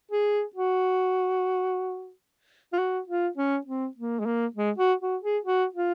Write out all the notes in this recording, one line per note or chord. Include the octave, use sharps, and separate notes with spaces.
G#4
F#4
F4
F#4
F4
C#4
C4
A#3
G#3
A#3
G#3
F#4
F#4
G#4
F#4
F4